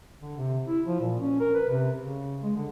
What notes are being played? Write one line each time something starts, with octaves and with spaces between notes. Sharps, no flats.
D3
C3
E4
F3
A#2
C#4
A#4
B4
C3
C#3
G#3
D3